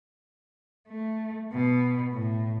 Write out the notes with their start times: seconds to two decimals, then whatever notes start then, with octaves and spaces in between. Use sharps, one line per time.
0.88 A3
1.52 B2
2.12 A2